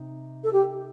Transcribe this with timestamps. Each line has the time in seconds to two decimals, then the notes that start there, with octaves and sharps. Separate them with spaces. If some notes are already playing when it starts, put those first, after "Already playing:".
Already playing: C3 D#4
0.43 A4
0.52 G4